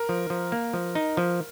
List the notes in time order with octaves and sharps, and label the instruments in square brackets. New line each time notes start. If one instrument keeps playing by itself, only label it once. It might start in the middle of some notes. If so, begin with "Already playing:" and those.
Already playing: [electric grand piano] A#4
[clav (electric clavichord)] F3
F3
A#3
F3
D#4
F3